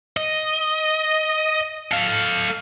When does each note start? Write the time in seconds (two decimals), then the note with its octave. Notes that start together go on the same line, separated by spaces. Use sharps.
0.17 D#5
1.91 A4 F5